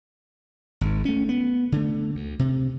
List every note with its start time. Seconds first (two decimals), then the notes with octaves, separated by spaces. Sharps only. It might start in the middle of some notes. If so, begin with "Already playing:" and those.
0.81 G#1 G#2
1.05 A3 C#4
1.29 B3
1.72 D3 A3
2.15 D2
2.39 C3